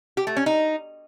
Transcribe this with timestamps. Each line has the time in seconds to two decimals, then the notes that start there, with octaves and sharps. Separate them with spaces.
0.17 G4
0.27 A3
0.37 C#4
0.46 D#4